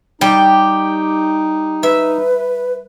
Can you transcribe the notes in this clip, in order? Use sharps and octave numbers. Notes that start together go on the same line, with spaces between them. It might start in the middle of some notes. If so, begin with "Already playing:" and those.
G3 D#4 G4
B4 E5